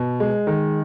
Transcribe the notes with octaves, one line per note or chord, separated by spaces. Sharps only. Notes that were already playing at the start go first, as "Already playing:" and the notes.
Already playing: B2
G#3
D#3